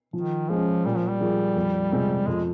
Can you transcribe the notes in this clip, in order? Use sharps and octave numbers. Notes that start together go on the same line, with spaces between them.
D#3 F3
F3 G#3 C#4
A#2 G3
F3
G3
F3 A#3 F4 G#4
F2
C3 F3 G#3 C4
F2 G#3